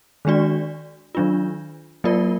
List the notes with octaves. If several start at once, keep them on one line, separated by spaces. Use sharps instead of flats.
D#3 G#3 D4 F#4 D5
D#3 F#3 D4 F4
F#3 A#3 F4 A#4 D5